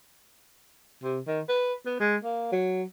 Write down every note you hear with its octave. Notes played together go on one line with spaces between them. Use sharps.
C3
D#3
B4
B3
G#3
A#3
F#3